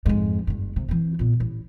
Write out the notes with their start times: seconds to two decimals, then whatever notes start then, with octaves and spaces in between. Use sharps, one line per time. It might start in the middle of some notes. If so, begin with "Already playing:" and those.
0.06 F2 G#2
0.47 F#1 G2
0.76 C3
0.88 E3 C4
1.19 A#2 B3
1.40 A1